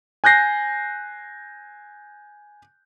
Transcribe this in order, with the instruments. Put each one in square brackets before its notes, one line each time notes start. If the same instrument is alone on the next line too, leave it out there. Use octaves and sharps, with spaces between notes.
[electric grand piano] G#5 F#6 G6 A#6 C7